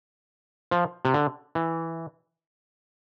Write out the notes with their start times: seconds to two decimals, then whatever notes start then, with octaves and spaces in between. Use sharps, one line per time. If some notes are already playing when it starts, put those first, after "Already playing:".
0.71 F3
1.05 C3
1.14 D3
1.55 E3